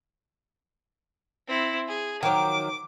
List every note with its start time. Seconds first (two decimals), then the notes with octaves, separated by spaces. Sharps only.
1.48 C4 E4
1.88 G#4
2.23 D#3 F3 F#3 D6